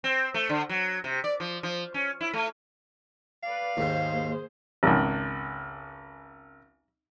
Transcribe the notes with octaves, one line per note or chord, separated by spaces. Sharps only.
C4
A3
D3
F#3
C3
D5
F3
F3
C#4
E4
A3
B4 D5 F5
D#2 G#2 A#3 G#4 C5
G#1 C#2